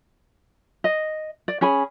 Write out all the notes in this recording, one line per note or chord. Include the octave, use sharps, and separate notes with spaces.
D#5
D5
C#4 G#4 G#5 B5